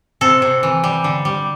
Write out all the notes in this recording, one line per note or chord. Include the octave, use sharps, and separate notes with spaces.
C3 A4
C3
E3
G3
D3
G3